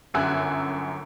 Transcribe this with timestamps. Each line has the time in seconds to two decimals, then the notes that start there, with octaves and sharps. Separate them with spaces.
0.14 G1 F#2 E5 G#5 E6 F#6